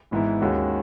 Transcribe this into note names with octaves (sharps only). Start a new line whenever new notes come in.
G#1 G#2 E3 B3 E4
D#2 D#3 G#3 C#4 F#4